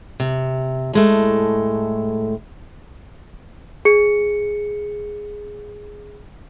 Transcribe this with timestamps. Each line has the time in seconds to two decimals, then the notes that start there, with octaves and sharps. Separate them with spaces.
0.20 C3
0.94 A2 G#3 A3
3.85 G#4 C#7